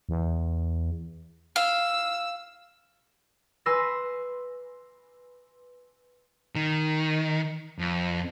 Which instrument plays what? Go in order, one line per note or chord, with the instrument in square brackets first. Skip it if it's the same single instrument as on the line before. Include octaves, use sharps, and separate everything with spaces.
[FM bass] E2
[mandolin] F5 [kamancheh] E6
[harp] B4 G#5 C6 E6 A#6
[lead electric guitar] D#3
F2